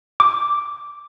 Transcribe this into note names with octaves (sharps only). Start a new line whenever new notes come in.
D6